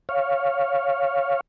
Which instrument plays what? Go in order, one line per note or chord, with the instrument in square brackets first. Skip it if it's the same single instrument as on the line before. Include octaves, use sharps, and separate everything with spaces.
[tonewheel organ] C#5 F5